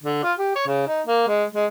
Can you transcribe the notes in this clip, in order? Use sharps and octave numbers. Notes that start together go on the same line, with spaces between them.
D3
F4
G4
C#5
C#3
D#4
A#3
G#3
G#3